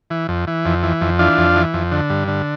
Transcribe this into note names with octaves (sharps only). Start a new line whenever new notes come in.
E3
F2
E3
F2
E3
F2
E3 D4 F4
F2
E3
F2
D3
G2
D3